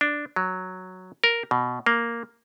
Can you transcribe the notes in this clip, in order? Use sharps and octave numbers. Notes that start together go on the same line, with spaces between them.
D4
F#3
A#4
B2
A#3